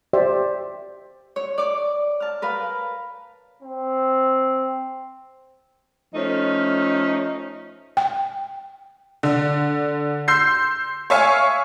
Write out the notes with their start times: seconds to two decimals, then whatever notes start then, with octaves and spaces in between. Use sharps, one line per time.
0.13 G4 C5 D5 E5
1.36 C#5
1.58 D5 D6
2.20 A5 F6
2.42 A#4 B4 F5
3.63 C4
6.15 F3 A3 C#4 D#4
7.97 G5
9.23 D3
10.28 C6 E6 G6 C7
11.10 C#5 E5 F5 G#5 C#6